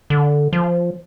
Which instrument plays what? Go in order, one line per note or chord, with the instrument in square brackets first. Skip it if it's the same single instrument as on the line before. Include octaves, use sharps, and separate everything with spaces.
[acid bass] D3
F3